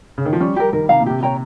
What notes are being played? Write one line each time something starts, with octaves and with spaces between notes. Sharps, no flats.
C#3
D#3
F3
G3 C#4
G4 A#4
D#3 A#4
C3 F5 A#5
A#2
C3 G4
C#5 G5 A#5